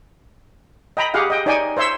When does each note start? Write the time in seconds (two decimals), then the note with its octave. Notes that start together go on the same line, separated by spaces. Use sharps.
0.97 D#5 G5 A#5 B5
1.14 G4 G#4 F5 F#5
1.30 D#5 G5
1.46 D#4 C#5 D5 G5 G#5
1.77 C5 C#5 E5 C6 E6